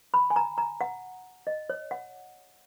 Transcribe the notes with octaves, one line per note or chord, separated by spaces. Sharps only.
B5
G#5
A#5
A#5
F#5
D#5
C#5
F#5